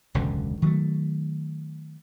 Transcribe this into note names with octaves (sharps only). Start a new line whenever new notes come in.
E1 C#2 F#2 D3
D#3 F#3 A3